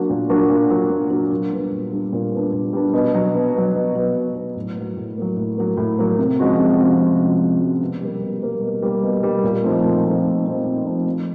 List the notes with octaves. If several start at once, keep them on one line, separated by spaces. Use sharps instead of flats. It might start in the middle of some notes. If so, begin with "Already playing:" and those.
Already playing: F#3 A#3 D4 F#4
A#2
F#3 A#3 D4 F#4
A#2
F#3 A#3 D4 F#4
A#2
F#3 A#3 D4 F#4
A#2
G3 B3 D4
A#2
G3 B3 D4
A#2
G3 B3 D4
A#2
G3 B3 D4
B2
F#3 B3
B2
F#3 B3
B2
F#3 B3
B2
F#3 B3
A2
F#3 A#3
A2
F#3 A#3
A2
F#3 A#3
A2
F#3 A#3
C3
F3 G#3 C#4 F#4
C3
F3 G#3 C#4 F#4
C3
F3 G#3 C#4 F#4
C3
F3 G#3 C#4 F#4
B2
G3 A#3
B2
G3 A#3
B2
G3 A#3
B2
G3 A#3
A#2
F3 A3 C4 D#4
A#2
F3 A3 C4 D#4
A#2
F3 A3 C4 D#4
A#2
F3 A3 C4 D#4
F3